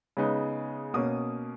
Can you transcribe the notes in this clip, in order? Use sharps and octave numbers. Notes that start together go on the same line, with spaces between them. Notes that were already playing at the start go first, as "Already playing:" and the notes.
C#3 G#3 B3 D#4
B2 A#3 C#4 D#6